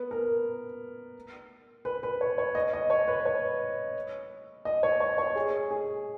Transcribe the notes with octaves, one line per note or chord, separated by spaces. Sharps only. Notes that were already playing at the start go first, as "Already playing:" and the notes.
Already playing: B3
A#4
B4
B4
C#5
C#5
D#5
D#5
C#5
B4
C#5
D#5
C#5
C#5
C#5
G#4
G#4